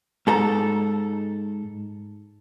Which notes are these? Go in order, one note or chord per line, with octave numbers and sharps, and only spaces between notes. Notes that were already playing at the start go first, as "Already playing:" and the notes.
G#2 A4 A#5